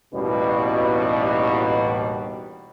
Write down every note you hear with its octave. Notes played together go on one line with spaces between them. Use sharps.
A1 D#2 B2 G3